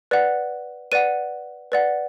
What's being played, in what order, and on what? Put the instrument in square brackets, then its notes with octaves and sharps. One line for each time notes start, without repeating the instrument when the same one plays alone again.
[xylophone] B4 D5 F#5
B4 D5 F#5 D#7
B4 D5 F#5